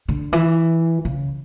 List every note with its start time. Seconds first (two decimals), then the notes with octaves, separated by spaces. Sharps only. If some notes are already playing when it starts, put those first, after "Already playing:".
0.08 D3
0.33 E3
1.05 C#3